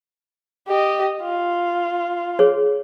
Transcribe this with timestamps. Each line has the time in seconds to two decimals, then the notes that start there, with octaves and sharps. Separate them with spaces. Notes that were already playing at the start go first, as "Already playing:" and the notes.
0.68 G4 D#5
1.22 F4
2.39 G#4 C#5